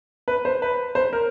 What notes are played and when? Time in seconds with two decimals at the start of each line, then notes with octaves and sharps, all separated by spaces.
0.28 B4
0.45 C5
0.62 B4
0.95 C5
1.13 A#4